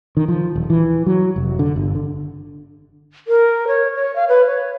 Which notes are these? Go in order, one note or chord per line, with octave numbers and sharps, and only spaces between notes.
D#3
F3
D#1
E3
F#3
F1
D3
G1
D3
A#4
C#5
C#5
F5
B4
C#5